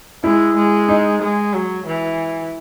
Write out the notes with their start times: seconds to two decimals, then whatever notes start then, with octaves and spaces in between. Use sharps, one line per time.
0.24 G#3 E4
0.57 G#3
0.89 D#4
1.22 G#3
1.54 F#3
1.87 E3